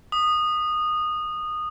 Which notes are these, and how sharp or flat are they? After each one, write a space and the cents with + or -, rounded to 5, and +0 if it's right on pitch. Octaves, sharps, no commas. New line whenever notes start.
D#6 -15